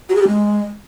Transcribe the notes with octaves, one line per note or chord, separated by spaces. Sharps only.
F#4
G#4
G4
G#3